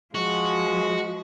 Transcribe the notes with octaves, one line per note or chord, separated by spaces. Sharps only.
F3 G#3 F#4